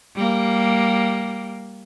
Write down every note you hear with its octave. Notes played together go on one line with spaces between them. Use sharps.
G3 A#3